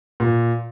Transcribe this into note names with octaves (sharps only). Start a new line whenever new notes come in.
A#2